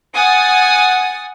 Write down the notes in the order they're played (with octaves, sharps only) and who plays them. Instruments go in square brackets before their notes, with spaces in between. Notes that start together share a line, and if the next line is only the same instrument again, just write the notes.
[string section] F#5 G#5 D#6 A6